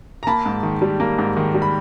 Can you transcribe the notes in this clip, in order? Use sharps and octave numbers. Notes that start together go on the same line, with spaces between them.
A#5
A#3 A5 B5
G#2
D#3
G3
A#3
G#2
D#3
G3
B5